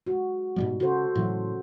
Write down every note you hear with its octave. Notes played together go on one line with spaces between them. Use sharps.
G#3 F#4
G#2 B2 G3
C#3 F#4 A4 C5
A2 C#3 E3 F#3